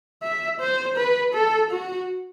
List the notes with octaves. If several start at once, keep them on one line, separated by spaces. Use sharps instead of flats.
E5
C5
B4
A4
F#4